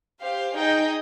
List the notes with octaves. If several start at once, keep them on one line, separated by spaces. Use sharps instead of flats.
G4 C5 F5
D#4 G#4 D#5 G5